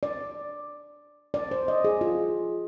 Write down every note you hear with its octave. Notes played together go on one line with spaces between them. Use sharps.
D5
D5
C5
D#5
G#4
F4